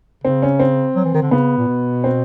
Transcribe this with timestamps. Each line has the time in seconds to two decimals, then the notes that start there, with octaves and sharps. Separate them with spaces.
0.24 C#3 C4
0.42 C#4
0.59 C4
0.96 F#3
1.05 E3
1.14 D#3
1.23 D3
1.31 C#3 B3
1.58 A#2
1.68 B2
2.04 C4